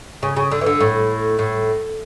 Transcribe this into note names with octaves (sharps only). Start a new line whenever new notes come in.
C#3
C#3
D3
E3
D3
A2
A2